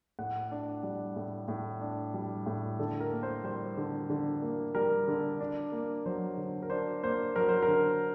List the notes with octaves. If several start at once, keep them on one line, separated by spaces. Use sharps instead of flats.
A2 F#5
D4
G3
A2
A2
D4
G3
A2
D3 A4
A#4
A#3
C5
G3 C5
D3
D3
A#3
G3 A#4
D3
D4
A#3
F#3 C5
D3
A#4
D4 C5
A#3 C5
F#3 A#4
C5
A#4
D3